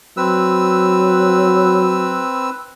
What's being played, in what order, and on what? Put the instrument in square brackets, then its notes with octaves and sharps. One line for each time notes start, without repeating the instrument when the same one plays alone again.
[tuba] F#3 [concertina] C4 B4 E6